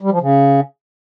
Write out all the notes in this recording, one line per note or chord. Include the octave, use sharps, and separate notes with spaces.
G3
F3
C#3